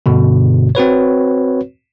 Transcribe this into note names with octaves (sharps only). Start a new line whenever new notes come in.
G2 B2 D3
C4 F#4 B4 C#5